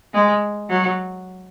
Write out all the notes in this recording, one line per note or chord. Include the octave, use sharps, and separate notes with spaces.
G#3
F#3